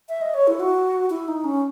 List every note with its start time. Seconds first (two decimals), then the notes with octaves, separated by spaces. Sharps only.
0.09 E5
0.21 D#5
0.34 C#5
0.47 E4
0.60 F#4
1.10 E4
1.28 D#4
1.44 C#4